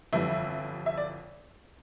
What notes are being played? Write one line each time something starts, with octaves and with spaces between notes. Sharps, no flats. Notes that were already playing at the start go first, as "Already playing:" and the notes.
G1 F2 E3 G3 E5
E5
D5